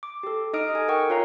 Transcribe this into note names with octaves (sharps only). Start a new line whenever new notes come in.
D6
G4 A4
D#4 D#5 D#6 F6 D7
A4 G#5
A#4 F#5 G5 C#6
F4 C#5 F5 A#5